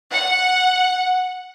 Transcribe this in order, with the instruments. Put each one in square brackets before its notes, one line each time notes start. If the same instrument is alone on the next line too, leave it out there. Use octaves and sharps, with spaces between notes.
[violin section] F#5